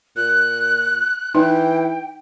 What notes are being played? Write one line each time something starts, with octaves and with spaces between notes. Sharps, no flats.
A#2 F#6
E3 D#4 G5